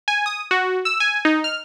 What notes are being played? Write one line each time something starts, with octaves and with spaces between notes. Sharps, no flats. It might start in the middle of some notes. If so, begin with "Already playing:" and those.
G#5
D#6
F#4
E6
G#5
D#4
F6